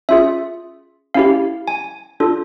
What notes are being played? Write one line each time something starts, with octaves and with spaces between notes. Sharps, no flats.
C#4 F4 G#4 E5
C#4 E4 G4 F5
G#5
D4 F4 A4